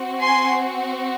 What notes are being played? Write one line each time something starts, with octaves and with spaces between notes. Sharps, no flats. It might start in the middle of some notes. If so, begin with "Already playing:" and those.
Already playing: C4 F#4
G#5 C6